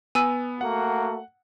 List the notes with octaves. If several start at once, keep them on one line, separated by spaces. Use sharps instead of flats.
B3 G#5 E6 D#7
A3 A#3 F#4 F#5